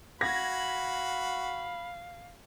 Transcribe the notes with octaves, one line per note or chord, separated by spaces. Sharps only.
F#4 F5 B5 G#6 A#6